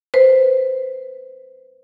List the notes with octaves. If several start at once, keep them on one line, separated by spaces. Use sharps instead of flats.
B4 C5